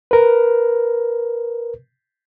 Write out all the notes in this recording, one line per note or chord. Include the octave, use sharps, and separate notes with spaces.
A#4 B4